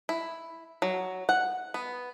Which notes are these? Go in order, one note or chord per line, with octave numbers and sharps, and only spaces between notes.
E4
F#3
F#5
B3